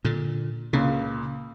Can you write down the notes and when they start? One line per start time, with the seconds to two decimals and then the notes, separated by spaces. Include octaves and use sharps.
0.05 A#2 D3
0.73 C#2 A#2 C#3